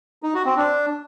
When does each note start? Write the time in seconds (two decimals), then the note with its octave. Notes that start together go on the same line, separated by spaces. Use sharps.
0.23 D#4
0.34 F#4
0.45 C4
0.57 D4